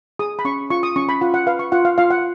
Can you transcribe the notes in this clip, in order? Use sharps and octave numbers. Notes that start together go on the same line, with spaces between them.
G#4 D#6
B5
C#4 C#6
F4 C#6
D#6
C#4 C#6
B5
F4 F#5
F#5
B4 F5
C#6
F4 F#5
F5
F4 F5
F#5